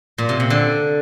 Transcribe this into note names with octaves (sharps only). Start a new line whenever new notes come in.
A#2
C3
C3
D3